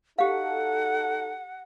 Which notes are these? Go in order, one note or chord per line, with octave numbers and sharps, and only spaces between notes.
D#4 F#4 G4 A4 F5 F#5